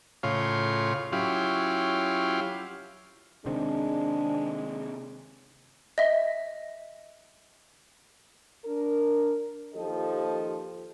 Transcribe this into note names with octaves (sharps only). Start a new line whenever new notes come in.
A2 C#3 F4 C#5 F5 C6
F#3 C#4 E4 F4 G4 F5
C3 D#3 G#3 C4 D4
D#5 E5
D4 A#4
D#2 F3 G4 A4 D#5